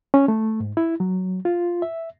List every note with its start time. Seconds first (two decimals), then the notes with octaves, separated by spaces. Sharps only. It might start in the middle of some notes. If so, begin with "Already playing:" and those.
0.14 C#4
0.28 A3
0.60 G#2
0.77 E4
1.00 F#3
1.45 F4
1.82 E5